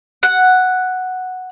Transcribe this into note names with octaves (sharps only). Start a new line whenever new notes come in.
F#5